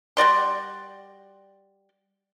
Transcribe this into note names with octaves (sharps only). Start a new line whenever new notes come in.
G3 F#4 D5 C6